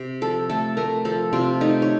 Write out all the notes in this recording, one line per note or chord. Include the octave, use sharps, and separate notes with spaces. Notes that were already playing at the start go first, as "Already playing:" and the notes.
Already playing: C3
F3 A4
A3 A4
A3 A#4
F3 A4
C3 F4
A3 D#4
C#5